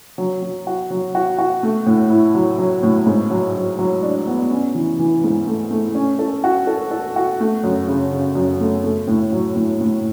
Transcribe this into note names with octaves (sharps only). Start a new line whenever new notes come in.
F#3
F#3
F#4
F#3
F#4
F#4
A3
A2
E4
F#3
F#3
A2
G#2
F#3
F#3
F#3
D4
B3
C#4
E3
E3
G#2
A3
A3
C#4
A4
F#4
A4
A4
F#4
A3
F#2
C#3
C#3
F#2
A3
A3
A2
F#3
A2
A2